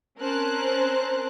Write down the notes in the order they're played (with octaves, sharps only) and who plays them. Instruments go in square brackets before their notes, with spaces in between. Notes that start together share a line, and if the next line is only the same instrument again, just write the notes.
[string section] C4 C#4 A#4 C5 A5 F#6